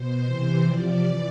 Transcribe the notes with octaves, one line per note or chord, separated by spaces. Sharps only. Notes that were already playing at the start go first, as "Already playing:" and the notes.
Already playing: B2 C5
C3 E3
C3 F3 D5
E3